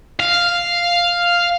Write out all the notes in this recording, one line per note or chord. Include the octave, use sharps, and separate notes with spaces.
F5